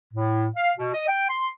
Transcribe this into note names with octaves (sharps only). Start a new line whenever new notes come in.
A2
F5
B2
D#5
G5
C6